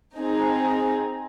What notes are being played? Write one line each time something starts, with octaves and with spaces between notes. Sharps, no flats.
C4 D#4 G#4